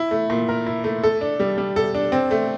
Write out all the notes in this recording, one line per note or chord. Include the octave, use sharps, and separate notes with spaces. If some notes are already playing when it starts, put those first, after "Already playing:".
Already playing: E4
A3
A#2
A#4
E4
A3
A4
D4
G3
G3
A4
D4
C4
A3